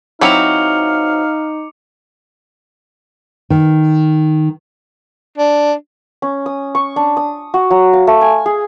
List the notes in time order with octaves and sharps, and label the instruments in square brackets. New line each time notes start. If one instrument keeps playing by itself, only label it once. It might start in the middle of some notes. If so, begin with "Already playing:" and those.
[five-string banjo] F#3 C4 E4 [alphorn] D#4 [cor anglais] F5 [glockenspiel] D6 C#7 F7
[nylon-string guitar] D#3
[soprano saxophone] D4
[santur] C#4
D#6
C#6
D4
D#6
F#4
F#3
F5
A3
G#5
G#4